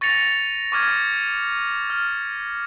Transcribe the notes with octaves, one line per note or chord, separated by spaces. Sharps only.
C#6 A6 A#6 C#7 F7
C#6 D6 F6 G#6
F6